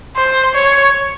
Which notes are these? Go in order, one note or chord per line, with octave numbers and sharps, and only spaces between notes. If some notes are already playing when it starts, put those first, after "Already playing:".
C5
C#5